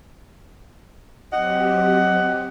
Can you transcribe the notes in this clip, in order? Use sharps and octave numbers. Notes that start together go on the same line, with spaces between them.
F#3 C4 G4 D#5 F#5